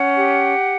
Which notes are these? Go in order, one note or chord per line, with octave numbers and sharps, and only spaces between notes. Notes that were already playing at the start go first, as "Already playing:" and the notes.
Already playing: C#4 F#5
G4